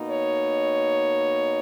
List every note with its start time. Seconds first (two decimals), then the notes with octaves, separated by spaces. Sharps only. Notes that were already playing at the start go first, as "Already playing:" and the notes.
Already playing: B2 A#3 D#4
0.11 C#5